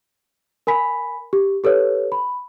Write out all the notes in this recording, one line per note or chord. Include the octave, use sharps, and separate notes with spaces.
A#4 G#5 B5 B6
G4
G4 A4 B4 C#5
B5